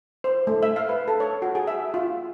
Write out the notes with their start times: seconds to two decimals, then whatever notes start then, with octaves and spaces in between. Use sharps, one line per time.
0.24 C5
0.47 A3
0.63 E5
0.76 F5
0.89 B4
1.08 A4
1.20 C#5
1.42 F#4
1.55 G#4
1.67 E5
1.94 F4